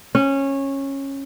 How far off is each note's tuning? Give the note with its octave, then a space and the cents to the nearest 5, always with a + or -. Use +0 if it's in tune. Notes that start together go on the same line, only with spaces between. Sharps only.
C#4 -15